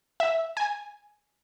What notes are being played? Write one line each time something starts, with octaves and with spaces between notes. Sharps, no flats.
E5
G#5